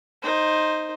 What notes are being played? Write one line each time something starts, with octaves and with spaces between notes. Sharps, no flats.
D#4 C5